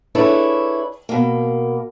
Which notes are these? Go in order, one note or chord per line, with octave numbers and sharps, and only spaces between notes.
D4 E4 G#4 A4 B4 C#5
B2 A#3